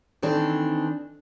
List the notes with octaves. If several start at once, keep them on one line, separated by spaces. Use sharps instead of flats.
D#3 E3 C4 D4 A4